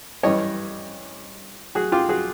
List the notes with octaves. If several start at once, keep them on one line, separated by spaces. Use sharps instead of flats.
G2 E3 G3 C#5 D#5
F#4 G#4
F4 G4
F#4 G#4